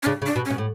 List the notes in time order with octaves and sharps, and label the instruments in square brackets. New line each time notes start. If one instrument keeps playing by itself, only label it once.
[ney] C#4
[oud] C#3 [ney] D4
[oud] C#3
[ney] D4
[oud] B2
[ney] C#4
[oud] B2
A2